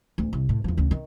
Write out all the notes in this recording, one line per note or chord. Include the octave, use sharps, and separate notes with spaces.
D1 D2
C2
A2
E2 F3
D2 C#3
D#3